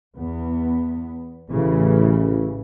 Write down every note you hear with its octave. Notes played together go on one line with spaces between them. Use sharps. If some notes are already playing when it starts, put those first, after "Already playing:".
E2 B3
A1 A2 C#3 E3